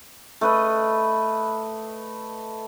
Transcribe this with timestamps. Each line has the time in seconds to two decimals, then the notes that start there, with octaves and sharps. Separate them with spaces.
0.41 A3 B4 D#5